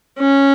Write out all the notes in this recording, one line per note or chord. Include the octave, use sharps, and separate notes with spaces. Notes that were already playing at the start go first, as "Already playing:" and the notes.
C#4